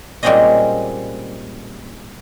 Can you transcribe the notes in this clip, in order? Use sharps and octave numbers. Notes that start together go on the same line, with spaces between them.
A#2 G3 G#3 C4 C#4 D#5